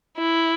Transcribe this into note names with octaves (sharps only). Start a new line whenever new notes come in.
E4